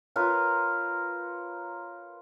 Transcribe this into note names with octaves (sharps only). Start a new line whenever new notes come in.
F4 A#4 B4 C#5